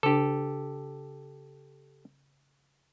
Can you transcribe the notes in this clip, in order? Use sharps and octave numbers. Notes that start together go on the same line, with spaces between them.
C#3 D4 G4 A4